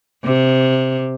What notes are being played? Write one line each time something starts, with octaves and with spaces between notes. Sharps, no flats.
C3